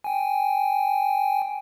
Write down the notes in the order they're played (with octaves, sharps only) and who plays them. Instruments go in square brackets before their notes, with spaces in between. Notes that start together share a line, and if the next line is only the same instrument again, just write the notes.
[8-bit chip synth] G5 G#5